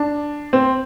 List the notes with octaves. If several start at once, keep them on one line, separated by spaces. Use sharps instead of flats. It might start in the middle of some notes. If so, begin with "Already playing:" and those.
Already playing: D4
C4